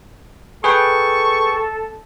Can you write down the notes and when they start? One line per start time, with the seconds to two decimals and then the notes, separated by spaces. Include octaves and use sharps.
0.64 G#4 A4 B4 G5 C#6